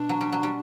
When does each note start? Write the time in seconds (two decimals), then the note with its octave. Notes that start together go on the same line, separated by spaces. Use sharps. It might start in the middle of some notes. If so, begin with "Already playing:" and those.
Already playing: B2 D4
0.09 F#3
0.21 G3
0.32 F#3
0.43 G3